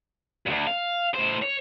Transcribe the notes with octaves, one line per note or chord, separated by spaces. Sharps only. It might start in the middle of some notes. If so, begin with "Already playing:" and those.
D2 G2
F5
A2 C5
C#5